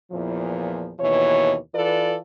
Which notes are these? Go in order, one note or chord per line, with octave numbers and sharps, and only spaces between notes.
E2 A#2 E3 F3
D#2 B2 E3 C#5
E3 F4 A4 B4 D5